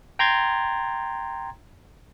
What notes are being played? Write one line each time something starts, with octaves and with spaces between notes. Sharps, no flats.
G5 A#5 C6 G#6 A6